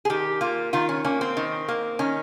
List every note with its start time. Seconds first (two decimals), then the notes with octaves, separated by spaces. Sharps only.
0.05 G#4
0.10 D#3 G4
0.41 A#3 F4
0.73 D#3 F4
0.89 C#4
1.04 A#3 C#4
1.21 C4
1.37 D#3
1.68 A#3
1.99 D#3 C#4